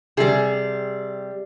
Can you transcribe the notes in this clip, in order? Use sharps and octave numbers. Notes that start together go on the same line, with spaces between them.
C3 G3 G#4